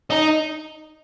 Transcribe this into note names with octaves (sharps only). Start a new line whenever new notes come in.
D#4